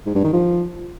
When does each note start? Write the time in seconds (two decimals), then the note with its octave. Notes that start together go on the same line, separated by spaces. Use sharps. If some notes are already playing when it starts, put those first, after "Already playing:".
0.06 G#2
0.15 G2
0.24 D#3
0.33 F3